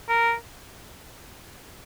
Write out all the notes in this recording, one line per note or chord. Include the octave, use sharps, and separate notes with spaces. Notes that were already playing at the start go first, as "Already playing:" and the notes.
A#4